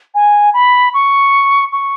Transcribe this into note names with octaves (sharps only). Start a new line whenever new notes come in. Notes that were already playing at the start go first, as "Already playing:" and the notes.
G#5
B5
C#6
C#6